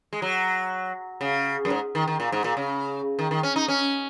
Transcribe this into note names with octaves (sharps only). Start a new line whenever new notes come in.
G#3
F#3
C#3
F#2
G#2
D#3
D#3
A#2
G#2
A#2
C#3
D#3
D#3
C#4
D#4
C#4